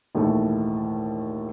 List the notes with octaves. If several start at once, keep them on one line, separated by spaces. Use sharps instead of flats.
A#1 D#2 G#2 E3 A3